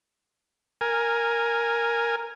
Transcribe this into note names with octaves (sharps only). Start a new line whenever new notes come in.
A#4 G#5